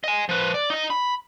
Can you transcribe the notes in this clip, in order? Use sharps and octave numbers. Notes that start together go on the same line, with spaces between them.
D#5 G#5
F3 B4
D5
D#4 D#5
B5